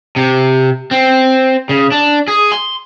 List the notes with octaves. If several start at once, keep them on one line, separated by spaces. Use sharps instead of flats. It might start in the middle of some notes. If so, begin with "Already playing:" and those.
C3
C4
C#3
D4
G#4
C6